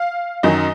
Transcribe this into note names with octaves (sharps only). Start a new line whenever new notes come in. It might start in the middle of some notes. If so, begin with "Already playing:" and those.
Already playing: F5
F#2 D#3 F#3 D#5